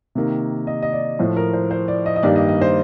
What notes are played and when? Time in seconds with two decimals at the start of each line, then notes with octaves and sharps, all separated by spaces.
0.15 C3 D#3 A#3
0.67 D#5
0.82 D#5
0.93 D5
1.19 A2 F3 A3 C5
1.37 A#4
1.53 C5
1.71 C5
1.88 D5
2.06 D#5
2.16 D#5
2.23 G2 D#3 G3 A#3 D5
2.36 D#5
2.49 D#5
2.61 C5